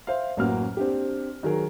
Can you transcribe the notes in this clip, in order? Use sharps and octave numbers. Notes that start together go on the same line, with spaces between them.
C5 E5 F5
A1 F#2 A#3 F#4 F6
C4 D4 G4
D#3 F#3 G#4 A#4